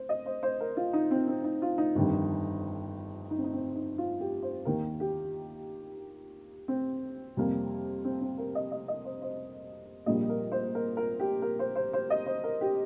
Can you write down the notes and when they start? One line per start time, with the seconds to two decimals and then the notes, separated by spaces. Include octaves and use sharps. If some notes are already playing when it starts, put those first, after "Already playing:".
Already playing: C5
0.09 D#5
0.26 C5
0.43 C5
0.61 A#4
0.77 F4
0.93 D#4
1.11 C4
1.28 C4
1.44 D#4
1.62 F4
1.78 D#4
1.95 G1 F2 D#3 G3
3.30 D#4
3.38 C4
3.44 D#4
3.53 C4
3.76 D#4
3.98 F4
4.20 G4
4.43 C5
4.65 D#2 D#3 A#3 A#4
5.00 G4
6.68 C4
7.37 F2 C3 G3 A#3
8.05 C4
8.21 C4
8.38 A#4
8.55 D#5
8.72 D#5
8.88 D#5
9.05 C5
9.22 C5
10.06 A#1 A#2 G3 A#3 D#5
10.30 A#4
10.52 C5
10.75 A#4
10.97 A#4
11.20 G4
11.42 A#4
11.59 C5
11.76 C5
11.93 C5
12.10 D#5
12.26 C5
12.44 A#4
12.61 G4